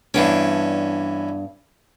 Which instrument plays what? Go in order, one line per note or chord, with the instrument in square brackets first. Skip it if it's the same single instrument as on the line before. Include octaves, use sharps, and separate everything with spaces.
[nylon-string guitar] G2 B3 D4 [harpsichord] E3 C#4